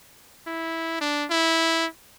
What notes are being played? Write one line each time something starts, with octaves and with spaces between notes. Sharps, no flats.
E4
D4
E4